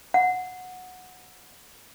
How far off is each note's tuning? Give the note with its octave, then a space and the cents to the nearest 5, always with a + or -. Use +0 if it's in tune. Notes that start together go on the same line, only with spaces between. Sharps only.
F#5 -15